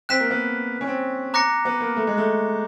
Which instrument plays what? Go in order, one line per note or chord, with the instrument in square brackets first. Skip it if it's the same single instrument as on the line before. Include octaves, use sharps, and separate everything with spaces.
[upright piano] C4 [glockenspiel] F#6 B6 E7
[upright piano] A#3
B3
C#4
C4
[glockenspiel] A#5 D6 F#6 A#6 C#7
[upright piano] B3
A#3
A3
G#3
A3